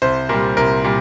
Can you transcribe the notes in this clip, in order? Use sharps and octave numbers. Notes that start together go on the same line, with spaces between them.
C2 C5
A#2 G3 A#4
C2 A#4
A#2 G3